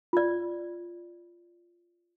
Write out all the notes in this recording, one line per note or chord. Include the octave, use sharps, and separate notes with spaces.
F4 D5